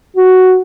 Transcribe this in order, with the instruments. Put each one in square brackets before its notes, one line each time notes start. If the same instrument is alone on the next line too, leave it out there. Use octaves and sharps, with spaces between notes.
[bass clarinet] F#4